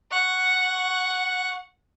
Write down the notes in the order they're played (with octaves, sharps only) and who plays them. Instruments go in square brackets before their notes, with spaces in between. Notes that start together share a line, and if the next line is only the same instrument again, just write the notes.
[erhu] F#5 [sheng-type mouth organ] C#6 F#6